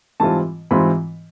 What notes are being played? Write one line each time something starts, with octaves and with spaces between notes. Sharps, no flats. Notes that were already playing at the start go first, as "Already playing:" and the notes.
G#2 E3 G3 C4 F4 A5
G#2 E3 G3 C4 F4 B5